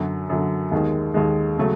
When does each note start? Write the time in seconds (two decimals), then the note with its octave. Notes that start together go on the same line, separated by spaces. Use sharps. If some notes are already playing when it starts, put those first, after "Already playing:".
Already playing: F#2 D3 F#3
0.30 F#2 D3 F#3
0.72 D#2 D#3 G#3
1.14 D#2 D#3 G#3
1.58 C#3 F#3 A3